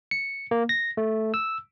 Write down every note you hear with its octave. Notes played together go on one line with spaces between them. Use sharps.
C#7
A#3
A#6
A3
E6